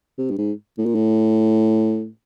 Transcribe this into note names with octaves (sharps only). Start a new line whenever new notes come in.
C3
G2
G#2
A2
A#2
A2